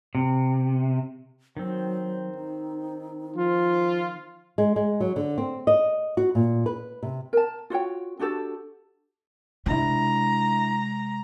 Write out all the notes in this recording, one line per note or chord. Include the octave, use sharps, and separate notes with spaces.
C3
D#3 F#3 C4
D#4
F3 F4
G#3
G#3
F#3
D3
C4
D#5
F#4
A#2
B4
C3
A#4 A5
F4 F#4 C#5 G5
D4 F#4 G4 A4
C3 G#3 D4 E4 A#5